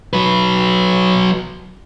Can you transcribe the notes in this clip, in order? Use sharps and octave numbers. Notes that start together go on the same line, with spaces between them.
F#3 B4